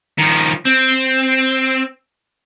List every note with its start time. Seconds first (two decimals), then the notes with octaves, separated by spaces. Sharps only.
0.18 D#3 F3
0.65 C4